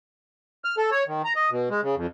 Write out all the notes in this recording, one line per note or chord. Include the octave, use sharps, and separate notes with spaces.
F6
A4
C#5
D#3
A#5
D#5
B2
G#3
C#3
F2